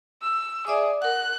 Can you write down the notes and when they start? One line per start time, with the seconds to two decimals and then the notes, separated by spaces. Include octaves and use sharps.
0.22 E6
0.67 G#4 D5 E5 D6
1.02 A#4 F#5 F#6